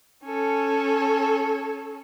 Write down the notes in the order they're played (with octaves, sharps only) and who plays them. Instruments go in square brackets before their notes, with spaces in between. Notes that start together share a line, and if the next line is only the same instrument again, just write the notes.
[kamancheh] C#4 A4